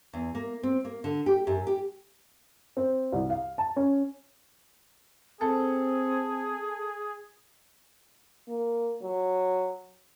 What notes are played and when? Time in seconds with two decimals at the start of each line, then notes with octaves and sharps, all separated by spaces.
0.13 E2
0.35 A#3
0.63 C4
0.85 A#3
1.04 D3
1.26 G4
1.47 F#2
1.67 G4
2.77 C4
3.12 C2
3.30 F5
3.58 A5
3.76 C#4
5.41 C4 G#4 A4
8.48 A#3
9.02 F#3